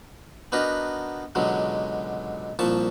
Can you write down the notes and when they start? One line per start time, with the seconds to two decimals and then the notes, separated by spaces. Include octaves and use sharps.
0.52 B3 D4 D#4 F#4 A#4 B4
1.35 C#2 B2 D3 F#3 G#3
2.59 C2 A#2 F3 A5 C#6